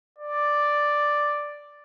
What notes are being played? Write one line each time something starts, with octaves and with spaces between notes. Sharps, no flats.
D5